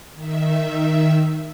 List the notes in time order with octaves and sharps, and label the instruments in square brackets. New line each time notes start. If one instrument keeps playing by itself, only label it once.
[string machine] D#3 E5